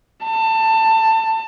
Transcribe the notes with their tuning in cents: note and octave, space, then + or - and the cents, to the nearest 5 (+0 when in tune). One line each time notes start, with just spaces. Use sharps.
A5 +20